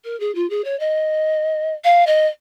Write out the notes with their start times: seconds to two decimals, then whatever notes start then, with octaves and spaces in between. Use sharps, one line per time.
0.04 A#4
0.20 G#4
0.35 F4
0.50 G#4
0.64 C#5
0.80 D#5
1.84 F5
2.07 D#5